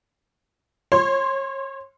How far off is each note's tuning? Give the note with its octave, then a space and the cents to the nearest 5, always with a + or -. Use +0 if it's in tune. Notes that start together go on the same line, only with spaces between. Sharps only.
C#5 -35 C6 +0